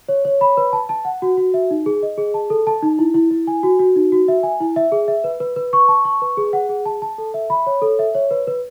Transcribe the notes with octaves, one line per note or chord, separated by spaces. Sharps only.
C#5
C#5
B5
B4
A5
A5
F#5
F#4
F#4
E5
D#4
G#4
D#5
G#4
A5
A4
A5
D#4
E4
E4
E4
G#5
F#4
F#4
D#4
F#4
E5
G#5
E4
E5
G#4
E5
B4
B4
B4
C#6
A5
C#6
B4
G#4
F#5
G#4
A5
A5
A4
E5
B5
C#5
A4
E5
C#5
B4
B4